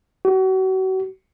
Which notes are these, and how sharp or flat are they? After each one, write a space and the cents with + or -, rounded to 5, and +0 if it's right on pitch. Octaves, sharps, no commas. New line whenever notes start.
F#4 +35